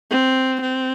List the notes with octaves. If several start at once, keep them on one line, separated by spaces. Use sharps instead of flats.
C4
C4